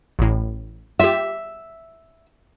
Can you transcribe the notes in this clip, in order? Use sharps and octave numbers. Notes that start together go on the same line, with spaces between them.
A1 A2
F4 G4 E5